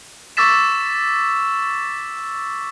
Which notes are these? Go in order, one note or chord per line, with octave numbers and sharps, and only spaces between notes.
C#6 D6 E6 A6 B6 E7